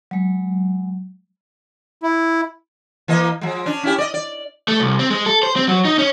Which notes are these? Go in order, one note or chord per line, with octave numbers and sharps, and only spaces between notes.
F#3 G#3
E4
E3 A#3 D#5
F3 G#3
C#4 D4
C#4 E4 G4
D5 D#5
D5
A3
C2
C4
G#3
A4
C5
C4
F#3
D#4
C#4